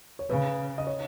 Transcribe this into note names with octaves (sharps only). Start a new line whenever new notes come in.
C#5
C#3 B4
D#5
C#5